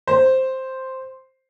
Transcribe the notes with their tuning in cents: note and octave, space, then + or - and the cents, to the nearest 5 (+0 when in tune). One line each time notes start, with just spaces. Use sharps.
C5 +0